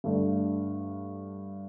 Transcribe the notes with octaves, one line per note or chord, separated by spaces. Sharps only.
G2 D3 A3